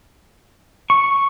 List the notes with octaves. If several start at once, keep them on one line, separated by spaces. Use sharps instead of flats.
C#6